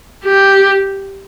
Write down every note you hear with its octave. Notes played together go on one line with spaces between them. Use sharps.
G4